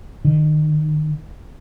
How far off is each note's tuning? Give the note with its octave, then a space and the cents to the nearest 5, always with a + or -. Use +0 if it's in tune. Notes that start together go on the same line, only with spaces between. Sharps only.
D#3 -30